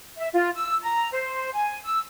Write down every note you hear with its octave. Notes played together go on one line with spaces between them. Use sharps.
E5
F4
E6
A#5
C5
G#5
E6